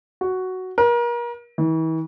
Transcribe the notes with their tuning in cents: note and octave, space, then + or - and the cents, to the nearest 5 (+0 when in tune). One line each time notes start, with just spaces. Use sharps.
F#4 +5
A#4 +35
E3 -40